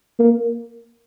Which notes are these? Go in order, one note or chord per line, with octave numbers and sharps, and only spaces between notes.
A#3